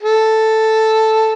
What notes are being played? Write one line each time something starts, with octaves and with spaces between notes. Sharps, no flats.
A4